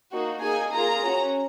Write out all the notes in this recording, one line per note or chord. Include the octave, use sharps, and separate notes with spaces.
A#3 D#4 F#4
A#3 D#4 G#4 G#5
A#3 F4 G#4 A#5
C#4 F#4